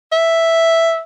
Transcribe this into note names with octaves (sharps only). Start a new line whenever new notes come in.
E5